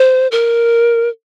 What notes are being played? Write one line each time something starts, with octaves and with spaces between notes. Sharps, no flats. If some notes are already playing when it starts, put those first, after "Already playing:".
Already playing: C5
A#4